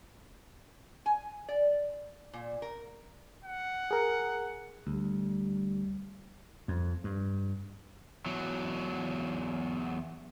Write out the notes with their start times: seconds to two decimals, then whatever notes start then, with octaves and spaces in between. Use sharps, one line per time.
1.06 G#5
1.49 D5
2.33 A#2
2.62 A#4
3.44 F#5
3.91 G#4 A#4
4.87 D2 G3
6.68 F2
7.04 G2
8.26 E2 F#3